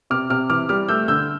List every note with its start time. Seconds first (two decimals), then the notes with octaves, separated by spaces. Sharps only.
0.10 C3 D6 F6
0.30 C3 D6 F6
0.50 E3 D6 F6
0.69 G3 D6 F6
0.88 A3 E6 G6
1.08 D3 E6 G6